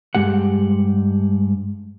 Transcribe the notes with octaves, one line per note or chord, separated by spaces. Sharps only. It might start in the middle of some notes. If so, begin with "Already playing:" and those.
G2 G#3 G4 F#5